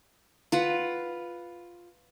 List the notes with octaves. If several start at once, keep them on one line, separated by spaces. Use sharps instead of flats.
F4 B4 F#5